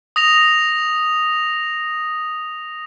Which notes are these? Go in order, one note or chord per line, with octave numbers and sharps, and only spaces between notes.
D#6 A#6 F7